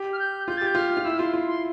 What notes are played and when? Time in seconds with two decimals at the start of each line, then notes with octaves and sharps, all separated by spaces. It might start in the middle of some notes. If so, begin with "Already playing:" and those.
Already playing: G4
0.13 F6
0.19 G6
0.47 F4 G6
0.57 G4 A6
0.67 G6
0.75 F4 F6
0.91 F6
0.97 F4
1.05 E4 E6
1.19 F4 C6
1.34 F4
1.48 C6